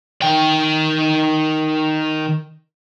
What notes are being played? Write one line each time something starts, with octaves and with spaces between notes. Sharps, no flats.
D#3 G5